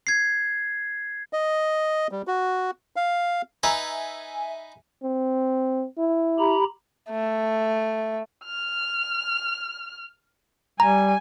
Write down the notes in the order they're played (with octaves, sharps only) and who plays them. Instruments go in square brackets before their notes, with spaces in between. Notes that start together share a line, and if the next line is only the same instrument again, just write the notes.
[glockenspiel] G#6 C7
[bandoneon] D#5
G3
F#4
F5
[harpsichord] D#4 B4 [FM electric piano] E5 G#5 [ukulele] A#5
[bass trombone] C4
E4
[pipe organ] G4 A#5 B5
[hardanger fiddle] A3
[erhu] F6
[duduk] G3 [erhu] G#5 [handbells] A#5